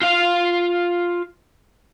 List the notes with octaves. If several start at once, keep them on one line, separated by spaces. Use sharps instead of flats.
F4 F5